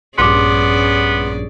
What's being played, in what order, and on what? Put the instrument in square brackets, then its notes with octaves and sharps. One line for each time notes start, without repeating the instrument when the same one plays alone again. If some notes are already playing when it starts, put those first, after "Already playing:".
[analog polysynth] A#1 G2 [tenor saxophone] B3 [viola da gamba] C#4 G#4 D5 [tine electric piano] C6 D6